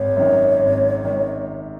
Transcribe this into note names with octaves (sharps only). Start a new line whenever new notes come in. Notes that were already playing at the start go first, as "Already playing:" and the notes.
Already playing: G#1 C#5
F#2 D#3
G#1
D#3